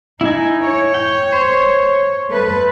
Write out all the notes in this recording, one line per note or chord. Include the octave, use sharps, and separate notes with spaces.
D#4 E4 G#5
C#5
G5
C5
A3 B4